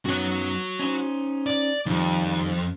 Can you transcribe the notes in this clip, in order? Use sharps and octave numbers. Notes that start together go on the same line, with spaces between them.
F#2 B3 D#4 F#4 C#5
C#4 D#4 C5
D5
F2 D#3 F3 G3